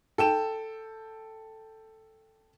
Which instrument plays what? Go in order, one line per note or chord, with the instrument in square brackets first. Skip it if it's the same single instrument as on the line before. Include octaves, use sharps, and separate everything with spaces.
[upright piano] A4 G5 E7